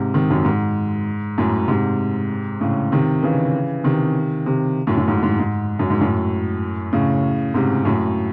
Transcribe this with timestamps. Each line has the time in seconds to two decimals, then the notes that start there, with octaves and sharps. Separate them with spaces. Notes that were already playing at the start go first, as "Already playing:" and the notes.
Already playing: G#2 C3
0.14 C3 D#3
0.30 F#2
0.45 G#2
1.38 F#2 A2
1.68 G#2 C3
2.61 A2 C#3
2.92 C3 D#3
3.23 C#3 E3
3.84 C3 D#3
4.46 C3 D#3
4.87 F#2 A2
4.97 F#2
5.08 G#2
5.23 G#2
5.39 G#2
5.79 F#2
5.90 G#2
6.01 F#2 A2
6.93 A2 C#3
7.54 G#2 C3
7.85 F#2 A2